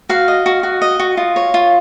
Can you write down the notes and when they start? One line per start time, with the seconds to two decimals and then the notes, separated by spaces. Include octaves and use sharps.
0.09 F#4 F5
0.28 D#5
0.46 F#4
0.63 F#4
0.81 D#5
0.99 F#4
1.17 F4
1.36 C#5
1.54 F4